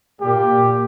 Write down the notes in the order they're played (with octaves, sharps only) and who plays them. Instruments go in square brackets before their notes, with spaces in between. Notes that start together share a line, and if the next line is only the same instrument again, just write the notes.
[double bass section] A#2 [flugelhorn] G4